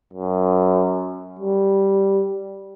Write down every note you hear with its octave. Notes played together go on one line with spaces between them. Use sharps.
F#2
G3